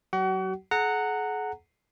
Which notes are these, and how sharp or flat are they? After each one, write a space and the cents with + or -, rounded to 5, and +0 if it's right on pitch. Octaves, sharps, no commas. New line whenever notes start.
F#3 +20 F#4 +40 F#5 +35
G#4 +45 F#5 +0 A#5 -20